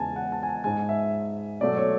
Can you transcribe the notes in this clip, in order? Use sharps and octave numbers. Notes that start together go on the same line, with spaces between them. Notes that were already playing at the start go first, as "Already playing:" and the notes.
Already playing: E2 C#3 G#3 G#5 A5
F#5
A5
G#5
A5
G#2 G#3 G#5
E5
B2 F#3 A3 D5
C#5